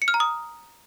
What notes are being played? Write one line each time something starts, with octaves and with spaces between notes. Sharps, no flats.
C#7
F6
A#5
D#6